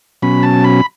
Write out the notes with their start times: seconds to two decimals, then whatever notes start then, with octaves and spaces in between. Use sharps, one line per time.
0.22 B2 F#3 C#4 B5
0.43 A5
0.64 B5